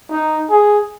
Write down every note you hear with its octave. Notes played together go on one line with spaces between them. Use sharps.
D#4
G#4